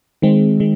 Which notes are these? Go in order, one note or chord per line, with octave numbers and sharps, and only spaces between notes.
D#3 G#3 C4
D#3 G#3